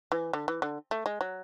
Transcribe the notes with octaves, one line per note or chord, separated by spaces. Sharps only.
E3
D3
E3
D3
A3
G#3
F#3